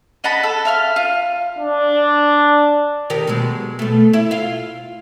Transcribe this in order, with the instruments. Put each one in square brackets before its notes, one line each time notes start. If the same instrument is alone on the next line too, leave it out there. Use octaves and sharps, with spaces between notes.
[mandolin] D#5 F#5 A5 B5
A4
E5 F5 F6
F4
[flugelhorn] D4
[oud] D#3 G4 A#4
B2 F#3 G#3
B2 A3
E4
F4 F5